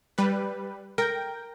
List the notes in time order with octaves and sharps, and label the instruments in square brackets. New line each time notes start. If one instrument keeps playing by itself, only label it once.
[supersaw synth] G3 B4
[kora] A#4 [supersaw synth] G5